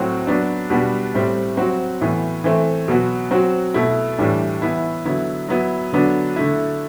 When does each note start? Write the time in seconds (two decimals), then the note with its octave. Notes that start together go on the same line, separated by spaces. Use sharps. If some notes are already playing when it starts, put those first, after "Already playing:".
Already playing: A2 F#3 C4 F#4
0.27 F#3 B3 D4
0.70 B2 G3 B3 D4 F#4
1.14 A2 G3 C4
1.57 F#3 C4 F#4
2.01 A2 E3 B3
2.44 E3 A3 C4
2.88 B2 F#3 B3 F#4
3.31 F#3 C4 F#4
3.74 B2 A3 E4
4.18 A2 E3 G3 D4
4.62 E3 B3 E4
5.05 D3 F#3 B3 E4
5.49 F#3 B3 E4
5.92 D3 F#3 B3 D4
6.36 D3 A3 E4